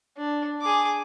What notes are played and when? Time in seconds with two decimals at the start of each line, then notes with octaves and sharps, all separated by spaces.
0.17 D4
0.62 G#4 D6